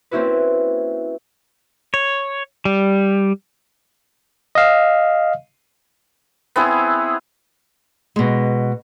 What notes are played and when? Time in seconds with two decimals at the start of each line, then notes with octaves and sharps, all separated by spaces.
0.11 A#3 C4 C#4 E4 F#4 B4
1.94 C#5
2.65 G3
4.55 D#5 F5
6.56 B3 C4 E4 G#4
8.16 B2 G#3